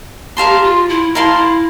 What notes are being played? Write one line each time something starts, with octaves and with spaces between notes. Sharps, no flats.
G4 A#4 F5 A5 C6
G4
F4
E4
E4 A#4 F5 A5 C6
E4